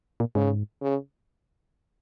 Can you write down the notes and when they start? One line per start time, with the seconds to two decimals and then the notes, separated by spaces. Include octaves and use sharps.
0.20 A#2
0.35 G#2 C#3
0.82 C#3